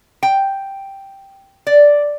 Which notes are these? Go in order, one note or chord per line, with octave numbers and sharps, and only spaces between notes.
G5
D5